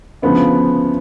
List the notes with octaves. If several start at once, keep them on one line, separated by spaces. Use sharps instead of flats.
D2 C#3 F3 B3